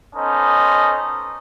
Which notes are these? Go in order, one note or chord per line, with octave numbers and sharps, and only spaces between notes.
B3 C#4 D#4 A4 C5 D#5